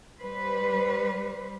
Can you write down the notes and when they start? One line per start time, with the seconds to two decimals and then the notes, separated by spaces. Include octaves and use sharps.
0.20 G3 B4 C5